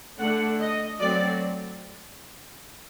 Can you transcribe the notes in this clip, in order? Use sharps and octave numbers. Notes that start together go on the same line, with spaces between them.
D3 A3 D4 F#5
D#5
F#3 A3 C4 D5